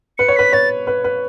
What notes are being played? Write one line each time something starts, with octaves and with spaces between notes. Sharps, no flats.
B4 C#7
C#5
B4 B6
C#5 A6
B4
B4